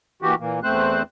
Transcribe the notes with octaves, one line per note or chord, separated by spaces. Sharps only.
A#2 E3 F#4 G4
A#2 E3 A#3
E2 A3 C4 C5 F#6